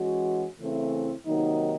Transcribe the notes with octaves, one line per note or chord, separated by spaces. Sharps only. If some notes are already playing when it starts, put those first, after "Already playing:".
Already playing: E3 G#3 C#4 F#4
C#3 E3 A3 C4 E4
C3 D#3 F#3 A#3 D#4